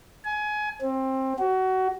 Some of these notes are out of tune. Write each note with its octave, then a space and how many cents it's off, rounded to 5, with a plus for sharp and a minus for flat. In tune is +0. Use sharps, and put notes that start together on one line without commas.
G#5 +25
C4 +20
F#4 +25